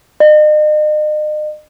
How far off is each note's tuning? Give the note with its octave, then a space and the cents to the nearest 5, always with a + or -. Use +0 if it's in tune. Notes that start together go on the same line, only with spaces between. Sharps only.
D#5 -40